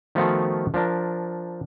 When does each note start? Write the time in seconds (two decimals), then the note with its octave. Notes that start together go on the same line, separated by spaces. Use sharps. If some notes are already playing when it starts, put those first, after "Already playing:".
0.15 D#3 F3 A3 B3 F4 F#4
0.74 F3 D4 A#4